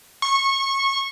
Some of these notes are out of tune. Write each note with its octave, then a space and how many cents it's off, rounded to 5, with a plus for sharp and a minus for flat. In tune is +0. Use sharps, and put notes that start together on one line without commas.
C#6 -20